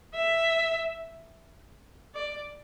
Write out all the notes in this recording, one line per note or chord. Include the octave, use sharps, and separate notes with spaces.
E5
D5